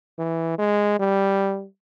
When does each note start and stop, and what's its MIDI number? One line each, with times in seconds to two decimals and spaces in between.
0.19 0.54 52
0.58 0.95 56
0.99 1.66 55